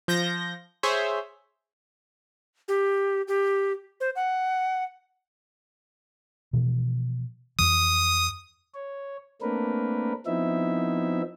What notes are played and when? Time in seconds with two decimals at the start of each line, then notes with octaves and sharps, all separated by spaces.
0.08 F3 G6 A#6
0.83 G#4 C5 C#5 E5
2.68 G4
3.28 G4
4.01 C5
4.16 F#5
6.53 B2 E3 F3
7.59 F2 E3 D#6
8.74 C#5
9.42 A3 A#3 C4 D4 A#4 B4
10.26 F3 B3 C4 D#4 E4 E5